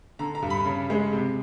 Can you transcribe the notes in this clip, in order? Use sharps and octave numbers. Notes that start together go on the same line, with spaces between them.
D3 A#5
A#5
G2
B5
C#3
G#3
C3